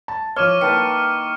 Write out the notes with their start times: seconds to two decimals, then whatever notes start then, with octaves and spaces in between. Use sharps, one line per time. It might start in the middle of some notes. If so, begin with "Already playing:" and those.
0.08 A5
0.36 F3 C#5 C#6 D6 F6
0.61 D#3 A#3 E4 B4 A5 C#7